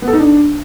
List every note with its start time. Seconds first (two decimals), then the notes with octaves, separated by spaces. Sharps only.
0.02 B3
0.08 A4
0.13 D#4
0.19 D4